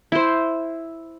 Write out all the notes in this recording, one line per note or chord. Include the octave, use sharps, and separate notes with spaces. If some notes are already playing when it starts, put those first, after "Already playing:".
E4 C5